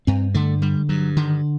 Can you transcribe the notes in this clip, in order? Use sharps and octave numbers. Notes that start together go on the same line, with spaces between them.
G2 C4
D3 A3
D3 G3
G2 F#3
D3 D#3